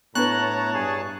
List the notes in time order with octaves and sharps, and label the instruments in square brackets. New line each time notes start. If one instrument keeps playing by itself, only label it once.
[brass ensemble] A2 A#5 [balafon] B3 D4 B4 [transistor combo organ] C#5 A5 [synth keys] F#6
[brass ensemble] G2 G#4